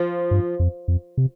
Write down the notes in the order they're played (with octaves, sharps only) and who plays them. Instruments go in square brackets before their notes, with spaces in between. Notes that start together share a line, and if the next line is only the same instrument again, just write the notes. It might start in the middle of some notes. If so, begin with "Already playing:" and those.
Already playing: [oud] F3
[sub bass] G2
F2
F2
C3